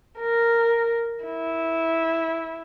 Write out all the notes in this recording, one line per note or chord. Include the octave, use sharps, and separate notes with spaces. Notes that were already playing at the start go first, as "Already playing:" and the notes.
A#4
E4